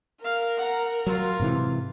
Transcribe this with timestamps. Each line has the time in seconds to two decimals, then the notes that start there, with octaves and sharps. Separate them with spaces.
0.24 A#4 F5
0.57 F#5 A#5
1.07 F#3 F4 C6
1.39 G#2 C3 E3